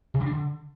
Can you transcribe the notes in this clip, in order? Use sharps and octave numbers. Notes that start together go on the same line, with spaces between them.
C3
C#3
D4
D3